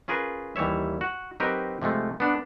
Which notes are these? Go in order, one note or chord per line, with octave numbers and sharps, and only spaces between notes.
C#4 F4 G#4 A#4 B4
D#2 E3 G3 C#5 E5
F#4
F#3 C4 D#4 G4 A#4 B4
C3 F3 G#3 A3
B3 D4